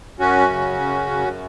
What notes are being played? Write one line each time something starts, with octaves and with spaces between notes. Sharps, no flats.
F#2 C#4 F#4
C#3
F#2
F#2